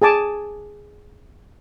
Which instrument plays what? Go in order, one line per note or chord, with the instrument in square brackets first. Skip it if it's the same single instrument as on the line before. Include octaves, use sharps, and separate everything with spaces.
[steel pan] G#4 G#5 A5 D6